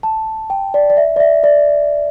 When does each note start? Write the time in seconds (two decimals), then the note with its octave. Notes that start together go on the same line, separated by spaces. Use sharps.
0.03 A5
0.50 G5
0.74 D5
0.90 D5
0.97 E5
1.16 D5
1.20 E5
1.44 D5